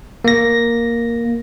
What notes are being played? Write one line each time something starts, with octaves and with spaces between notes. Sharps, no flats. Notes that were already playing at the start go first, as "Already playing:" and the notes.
A#3 A#6